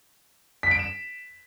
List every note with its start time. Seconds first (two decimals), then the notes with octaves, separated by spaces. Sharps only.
0.63 B6
0.71 D7
0.79 E7